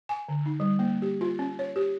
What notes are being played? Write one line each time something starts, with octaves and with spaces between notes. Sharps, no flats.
G#5
D3
D#4
G3
A#3
G4
F4
C#4
C#5
G4